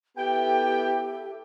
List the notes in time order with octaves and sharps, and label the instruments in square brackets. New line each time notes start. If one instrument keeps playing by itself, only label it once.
[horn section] B3 E4 G5 [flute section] G4 A4 E5